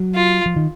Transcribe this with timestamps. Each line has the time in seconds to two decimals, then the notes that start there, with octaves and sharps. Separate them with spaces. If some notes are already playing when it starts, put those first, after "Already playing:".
Already playing: F#3
0.14 F4
0.46 F3
0.56 D#3